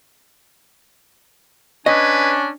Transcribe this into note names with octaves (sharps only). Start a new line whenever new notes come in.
C#4 D4 B4 D#5 G#5